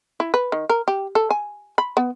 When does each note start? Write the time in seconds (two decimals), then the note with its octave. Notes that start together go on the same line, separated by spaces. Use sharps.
0.20 E4
0.34 B4
0.52 D#3
0.69 A#4
0.88 G4
1.15 A4
1.30 G#5
1.78 B5
1.97 B3